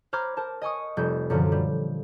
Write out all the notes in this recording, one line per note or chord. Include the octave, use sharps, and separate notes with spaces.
C5 A#5 B5 D6 F6 G#6
A#4 C5 A5
D#5 G#5 C#6 D#6
F1 G3 G6
F#2 A#2 D3 E3 F3
G3